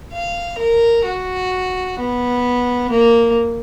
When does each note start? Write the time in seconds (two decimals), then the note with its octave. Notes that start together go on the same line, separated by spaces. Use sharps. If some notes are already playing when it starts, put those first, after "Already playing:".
0.12 F5
0.58 A#4
1.05 F#4
1.98 B3
2.90 A#3